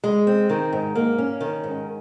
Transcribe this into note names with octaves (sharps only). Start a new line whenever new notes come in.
G#3
C4
D#3
G#2
A#3
C#4
D#3
G#2